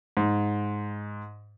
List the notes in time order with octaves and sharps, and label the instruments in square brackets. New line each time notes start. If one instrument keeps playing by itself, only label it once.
[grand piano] G#2